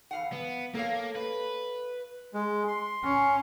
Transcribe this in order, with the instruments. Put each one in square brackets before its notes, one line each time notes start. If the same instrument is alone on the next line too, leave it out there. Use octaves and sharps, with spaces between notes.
[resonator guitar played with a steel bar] E2 F5 F#5
[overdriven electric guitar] B3
[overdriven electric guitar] A#3 [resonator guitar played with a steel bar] A4 C#5 F5
[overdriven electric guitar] B4
[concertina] G#3
C6
[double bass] C#4